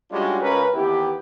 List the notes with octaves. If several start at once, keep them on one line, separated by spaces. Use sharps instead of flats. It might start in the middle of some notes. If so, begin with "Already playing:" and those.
G3 G#3 C#4 D4 F4 F#4
C#2 C#4 F4 A#4 B4
D#2 E3 B3 E4 G4